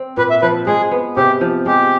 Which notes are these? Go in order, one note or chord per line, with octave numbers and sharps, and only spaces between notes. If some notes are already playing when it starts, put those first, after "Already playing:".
Already playing: C4
A#2 B4
E5
F3 B4
G#3 G#4
B3
C3 G4
F3
G#3 G4